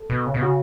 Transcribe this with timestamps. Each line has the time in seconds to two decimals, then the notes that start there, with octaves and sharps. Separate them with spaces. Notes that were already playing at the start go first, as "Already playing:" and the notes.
Already playing: A4
0.10 B2
0.27 C#3
0.34 B2
0.41 C#3 F#4